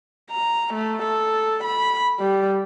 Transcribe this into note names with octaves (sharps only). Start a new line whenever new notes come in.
A#5
A3
A4
B5
G3